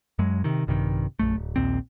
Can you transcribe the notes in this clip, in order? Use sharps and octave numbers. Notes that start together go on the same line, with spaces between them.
F#2 F#3 G#3
C3 D#3
A#1 G2 C3 D#3
A#1 F#2 A3
D1
A#1 D#2 A#2 C4